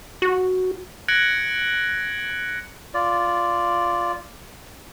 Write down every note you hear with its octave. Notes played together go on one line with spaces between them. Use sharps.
F#4
F#6 G#6 A#6 C#7 D7 F#7
F4 D5